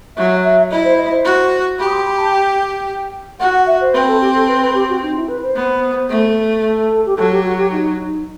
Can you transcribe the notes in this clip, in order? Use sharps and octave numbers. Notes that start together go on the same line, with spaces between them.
F#3 E5
E5
E4 D#5
C5
D#5
C5
F#4
G4 B5
D#6
C6
B5
A5
G5
F#4 F#5
F#5
E5
C5
C4 B4
A4
G4
A4
B4
B4
G4
F#4
D#4
E4
B4
C5
B3
A3
A4
G4
F#3 A4
G4
F#4
G4
D#4
D#4